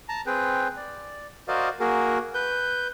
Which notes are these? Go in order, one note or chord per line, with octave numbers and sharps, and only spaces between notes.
A5 A#5
C4 G#4 B4 G5
D5
F#4 A#4 C5 D5 D#5 F5
A#3 F#4 G#4 A#4
B4 G6